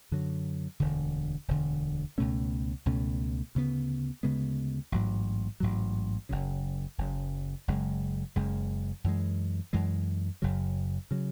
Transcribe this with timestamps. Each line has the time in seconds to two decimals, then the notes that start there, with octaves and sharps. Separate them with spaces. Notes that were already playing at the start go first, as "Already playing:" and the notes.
0.11 F#2 D3 F#3
0.80 E1 D2 D3
1.48 E1 D2 D3
2.18 C#2 B2 A3 C#4
2.86 C#2 B2 A3 C#4
3.55 D2 C#3 G#3 B3
4.23 D2 C#3 G#3 B3
4.92 A1 G#2 F#3
5.60 A1 G#2 F#3
6.29 F#1 F#2 C#3
6.98 F#1 F#2 C#3
7.68 F#1 F#2 C#3 G#3
8.36 F#1 F#2 C#3 G#3
9.04 F#2 E3 G#3
9.73 F#2 E3 G#3
10.42 F#1 F#2 C#3 F#3
11.11 C#3 F#3